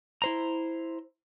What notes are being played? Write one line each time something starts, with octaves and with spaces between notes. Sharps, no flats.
E4 C5 A#5